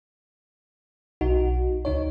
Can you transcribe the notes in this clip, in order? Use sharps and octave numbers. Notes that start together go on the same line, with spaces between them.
B1 D#4 F#4
C#2 D#4 C#5